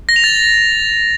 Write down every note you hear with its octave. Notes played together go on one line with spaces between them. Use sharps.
A#6
F7
A6